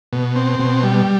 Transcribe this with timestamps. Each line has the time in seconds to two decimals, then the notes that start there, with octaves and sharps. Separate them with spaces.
0.13 B2
0.36 C4
0.59 B2
0.83 G3